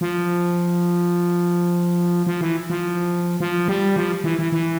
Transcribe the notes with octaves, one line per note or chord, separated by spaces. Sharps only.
F3
F3
E3
F3
F3
G3
F3
E3
E3
E3